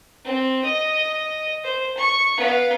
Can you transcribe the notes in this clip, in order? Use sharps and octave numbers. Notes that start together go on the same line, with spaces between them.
C4
D#5
C5
C#6
B3 F5